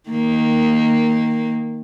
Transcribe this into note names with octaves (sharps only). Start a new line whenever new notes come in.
D#3 A#3